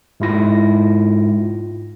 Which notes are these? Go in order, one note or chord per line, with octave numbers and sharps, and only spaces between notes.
G#2 G#3 E4 F4 A#6